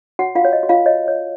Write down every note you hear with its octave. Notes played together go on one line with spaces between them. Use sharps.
F#4 C#5 F#5
F4 F5
F#4 C#5
D#5
F#4
F4 F5
C#5 D#5
C#5